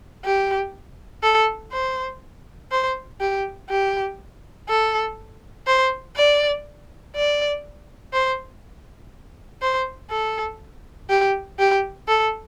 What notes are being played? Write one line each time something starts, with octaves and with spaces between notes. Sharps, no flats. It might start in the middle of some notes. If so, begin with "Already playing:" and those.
G4
A4
C5
C5
G4
G4
A4
C5
D5
D5
C5
C5
A4
G4
G4
A4